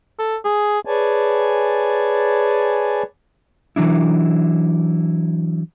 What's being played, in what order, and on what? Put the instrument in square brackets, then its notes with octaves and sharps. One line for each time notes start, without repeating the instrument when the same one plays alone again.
[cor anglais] A4
G#4
[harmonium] G#4 B4 C#5 D5 G#5 A5
[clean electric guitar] E3 F#3 D4 E4